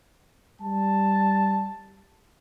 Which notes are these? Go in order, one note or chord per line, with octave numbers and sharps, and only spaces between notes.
G3 A5